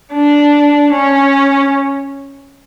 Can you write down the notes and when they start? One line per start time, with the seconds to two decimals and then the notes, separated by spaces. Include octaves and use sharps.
0.14 D4
0.93 C#4